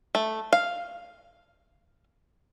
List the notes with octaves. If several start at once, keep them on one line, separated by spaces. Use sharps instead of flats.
A3
F5